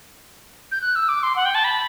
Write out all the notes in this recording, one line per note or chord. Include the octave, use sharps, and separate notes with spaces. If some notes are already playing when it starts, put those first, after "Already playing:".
G6
F#6
E6
D6
C6
F#5
G5
A5
B5